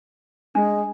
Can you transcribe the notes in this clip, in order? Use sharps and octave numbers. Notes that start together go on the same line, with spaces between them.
G#3 D4